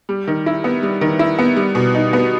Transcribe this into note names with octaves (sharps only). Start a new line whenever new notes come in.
G3
D#3
E4
B3
G3
D#3
E4
B3
G3
B2
D#4
B3